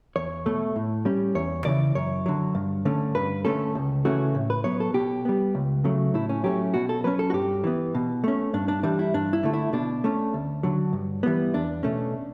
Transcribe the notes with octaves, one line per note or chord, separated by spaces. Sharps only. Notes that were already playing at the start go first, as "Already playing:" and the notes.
E2 C#5
B2 A3
A2
G3 C#4
E2 C#5
C#3 E3 D5
F#2 C#5
D3 F#3
G2
D3 A3 C#4
G2 B4
D3 A3 C#4 A4
C#2
C#3 E3 A3 C#4 F#4
A2
B4
F#3 B3 C#5
A4
B2 G4
G3 B3
C#2
C#3 F#3 A3
A2 E4
C#4
F#3 A3 C#4 G4
B2 F#4
A4
F#3 C#4 B4
A4
F#4
G2 G4
E3 B3
B2
A3 C#4
G2 D4
D4
E3 G3 D4
E4
G2 D4
E4
D3 A3
E4
B2 D4
A3 C#4
D2
D3 F#3
G2
E3 G3 B3
E2 D4
B2 A3 C#4